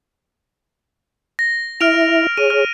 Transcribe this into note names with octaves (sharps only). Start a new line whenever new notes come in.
A#6
E4 E5 F6 D7 F7
G#4 C#5 D#7
F6